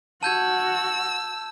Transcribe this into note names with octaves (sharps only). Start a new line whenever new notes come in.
F#4 A5 E6 G6 G#6